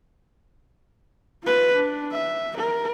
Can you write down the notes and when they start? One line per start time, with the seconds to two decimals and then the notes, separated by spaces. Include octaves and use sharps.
1.44 F4 B4
1.75 D4
2.12 E5
2.57 A#4